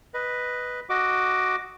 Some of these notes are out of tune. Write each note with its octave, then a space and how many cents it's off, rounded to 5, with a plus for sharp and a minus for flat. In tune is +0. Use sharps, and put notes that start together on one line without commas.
B4 +0 D#5 +0
F#4 +0 D#5 +5 D6 +0